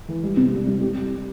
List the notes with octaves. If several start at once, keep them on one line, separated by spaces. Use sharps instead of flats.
E3
G3
C3
G3
G3
G4